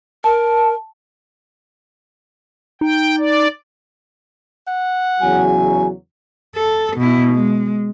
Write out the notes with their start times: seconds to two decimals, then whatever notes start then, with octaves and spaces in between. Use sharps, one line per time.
0.24 A#4 A5
2.81 D#4 G5
3.18 D5
4.67 F#5
5.21 E2 C#3 F#3 G#5
6.55 A4
6.97 B2 E4
7.32 G#3